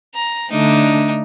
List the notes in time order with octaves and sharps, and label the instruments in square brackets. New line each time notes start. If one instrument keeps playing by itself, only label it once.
[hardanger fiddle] A#5
[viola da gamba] D3 A3 [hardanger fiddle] D4 D#4